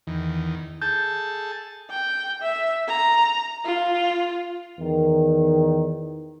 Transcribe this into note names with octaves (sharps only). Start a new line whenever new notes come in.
E2 D#3
G#4 A4 A5 G6
G5
E5
A#5
F4
E2 D#3